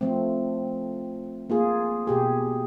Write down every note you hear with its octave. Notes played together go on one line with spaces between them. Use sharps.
F3 A3 C4
A#3 F4 G#4
B2 G4 G#4